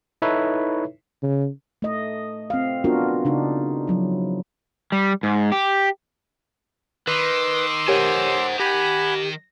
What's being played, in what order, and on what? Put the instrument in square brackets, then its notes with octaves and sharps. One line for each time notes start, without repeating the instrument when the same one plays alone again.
[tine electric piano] D#4 E4 A4 B4 C#5 E5
[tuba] C#3
[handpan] A3 D#5
C4 F5
B3 D4 F4 F#4 A#4
C#3 D4 D#4
F3 F#3 E4
[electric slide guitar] G3
G#2
G4
[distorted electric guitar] D#3 [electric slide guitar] B4 [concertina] C6 D6 E6
[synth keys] G4 A#4 C#5 [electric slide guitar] C5 F#5 G#5
[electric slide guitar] G4 [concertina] F#5 G#5 B5 [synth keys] A#6